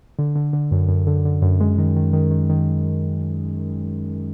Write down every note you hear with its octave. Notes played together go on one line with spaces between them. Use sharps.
D3
D3
D3
F#2
F#2
D3
D3
F#2
G#3
D#3
D#3
D#3
D#3
D#3